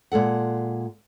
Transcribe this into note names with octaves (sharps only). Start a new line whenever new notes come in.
A#2 G#3 A4 F#5